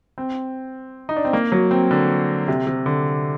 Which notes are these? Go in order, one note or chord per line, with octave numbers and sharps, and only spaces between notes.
C4
D#4
D4
C4
A#3
F#3
C4
D3
C3
C3
D3